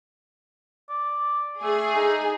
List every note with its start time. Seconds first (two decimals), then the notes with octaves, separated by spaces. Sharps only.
0.89 D5
1.62 A3 G#4
1.95 D#4